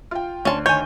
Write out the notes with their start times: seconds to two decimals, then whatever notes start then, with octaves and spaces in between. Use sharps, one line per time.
0.11 F4 G5
0.45 D2 C#4 D5 A5 C6
0.66 D#3 C#5 G#5 G6